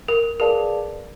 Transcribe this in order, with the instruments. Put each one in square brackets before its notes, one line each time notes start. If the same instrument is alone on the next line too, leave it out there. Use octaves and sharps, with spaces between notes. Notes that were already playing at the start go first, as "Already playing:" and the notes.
[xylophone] A#4
[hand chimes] G#4 B4 D5 F5 A5 [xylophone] A#4